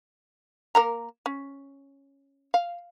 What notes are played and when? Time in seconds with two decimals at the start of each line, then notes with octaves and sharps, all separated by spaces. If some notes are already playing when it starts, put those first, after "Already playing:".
0.75 A#3 A#4 A#5
1.26 C#4
2.54 F5